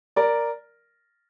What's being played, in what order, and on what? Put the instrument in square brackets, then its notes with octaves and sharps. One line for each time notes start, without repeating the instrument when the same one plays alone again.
[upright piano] A#4 D5